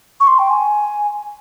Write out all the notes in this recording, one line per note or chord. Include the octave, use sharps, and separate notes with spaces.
C#6
C6
G5
G#5